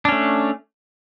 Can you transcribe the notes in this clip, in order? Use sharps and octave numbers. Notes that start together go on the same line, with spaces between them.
A3 C#4 D4